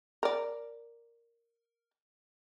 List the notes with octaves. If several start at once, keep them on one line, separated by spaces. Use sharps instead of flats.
A#4 D5